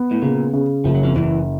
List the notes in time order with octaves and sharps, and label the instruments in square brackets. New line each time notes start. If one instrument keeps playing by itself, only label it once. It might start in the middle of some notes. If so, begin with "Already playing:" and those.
Already playing: [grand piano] B3
[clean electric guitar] A2
[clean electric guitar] A#2 [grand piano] C#3
[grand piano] C#3
[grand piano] F#1 [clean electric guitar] F3
[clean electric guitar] F#3
F2 F3
[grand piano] F#1 [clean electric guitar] E2 E3